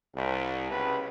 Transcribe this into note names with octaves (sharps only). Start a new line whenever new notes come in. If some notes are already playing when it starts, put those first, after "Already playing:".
C2
C#2 B3 B4